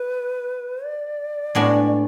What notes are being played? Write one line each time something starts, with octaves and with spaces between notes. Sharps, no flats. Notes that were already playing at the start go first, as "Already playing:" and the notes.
Already playing: B4
D5
A2 G#3 B3 D4 F#4